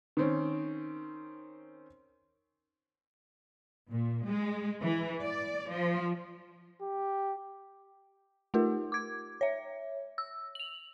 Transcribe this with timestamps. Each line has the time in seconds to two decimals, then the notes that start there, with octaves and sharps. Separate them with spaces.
0.17 D#3 C4 C#4
3.91 A#2
4.25 G#3
4.82 E3
5.22 D5
5.70 F3
6.81 G4
8.54 A3 D#4 F4 G4 A#4
8.92 D6 G#6
9.41 C#5 E5
10.18 E6
10.55 F7 F#7